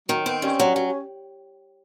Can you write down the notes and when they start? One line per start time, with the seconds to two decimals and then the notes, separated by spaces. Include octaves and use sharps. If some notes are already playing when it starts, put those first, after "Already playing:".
0.09 D#3 F#3
0.26 B3 C4
0.42 G2 C#4
0.60 F#3
0.76 F#3